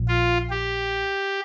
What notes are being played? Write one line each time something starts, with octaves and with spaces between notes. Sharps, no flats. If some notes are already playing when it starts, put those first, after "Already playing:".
Already playing: A#1 A#2 F3
F4
G4